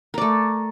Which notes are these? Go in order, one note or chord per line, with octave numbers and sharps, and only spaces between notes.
A3 A#4 D5